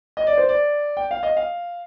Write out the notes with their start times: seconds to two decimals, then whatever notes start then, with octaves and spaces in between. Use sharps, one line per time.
0.17 D#5
0.27 D5
0.37 C5
0.49 D5
0.97 G5
1.11 F5
1.23 D#5
1.37 F5